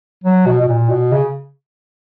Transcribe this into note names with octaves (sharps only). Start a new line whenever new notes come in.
F#3
B2
B2
A#2
B2
C#3